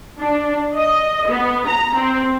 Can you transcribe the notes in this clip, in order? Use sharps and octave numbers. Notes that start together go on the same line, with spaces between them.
D4
D#5
B3
A#5
C4